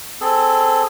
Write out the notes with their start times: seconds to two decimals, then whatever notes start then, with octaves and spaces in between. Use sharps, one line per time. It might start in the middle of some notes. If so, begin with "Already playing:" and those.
0.21 C4 G#4 A4